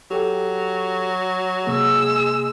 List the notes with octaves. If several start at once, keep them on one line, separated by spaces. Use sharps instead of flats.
F#3 G4 A4 G5
C3 G#3 A#3 E6